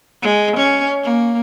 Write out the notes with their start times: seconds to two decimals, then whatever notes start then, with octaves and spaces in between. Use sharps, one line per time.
0.22 G#3
0.56 C#4
1.03 A#3